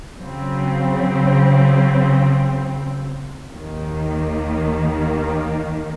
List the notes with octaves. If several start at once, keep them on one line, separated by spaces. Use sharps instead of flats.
C#3 F#3 C4
D#2 D#3 A#3